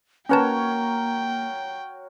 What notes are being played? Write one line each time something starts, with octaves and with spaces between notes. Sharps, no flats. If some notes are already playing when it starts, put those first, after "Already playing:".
A#3 C#4 F#4 A#4 B4 C#5 G5 A5